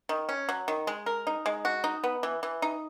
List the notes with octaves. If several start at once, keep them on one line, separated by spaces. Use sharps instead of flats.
D#3
C#4
F#3
D#3
G#3
A#4
D#4
G#3
F#4
D#4
B3
E3
E3
D#4